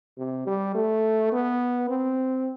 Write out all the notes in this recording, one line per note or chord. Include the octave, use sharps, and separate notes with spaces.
C3
G3
A3
B3
C4